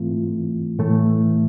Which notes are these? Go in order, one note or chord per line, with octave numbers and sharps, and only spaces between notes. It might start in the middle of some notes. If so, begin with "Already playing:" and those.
Already playing: G#2 E3 A3 C4 F4
A2 E3 A3